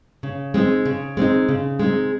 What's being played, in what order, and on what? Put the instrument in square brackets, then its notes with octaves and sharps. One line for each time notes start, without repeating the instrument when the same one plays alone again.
[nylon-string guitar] C#3
G#3 C4 D#4
C#3
G#3 C4 D#4
C#3
G#3 C4 D#4